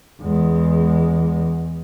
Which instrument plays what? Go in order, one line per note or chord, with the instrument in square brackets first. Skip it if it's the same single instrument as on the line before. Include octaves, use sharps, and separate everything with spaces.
[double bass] E2 G#3